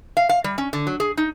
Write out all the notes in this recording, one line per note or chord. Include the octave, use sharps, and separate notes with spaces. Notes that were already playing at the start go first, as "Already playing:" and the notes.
F5
F5
G3
C#4
D3
F#3
G#4
D#4